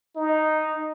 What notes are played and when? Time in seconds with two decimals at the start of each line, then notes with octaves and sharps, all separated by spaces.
0.16 D#4